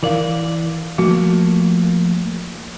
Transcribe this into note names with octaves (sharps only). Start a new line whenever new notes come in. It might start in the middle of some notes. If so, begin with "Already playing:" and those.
E3 A#4 D5 F5
F3 A3 A#3 F#4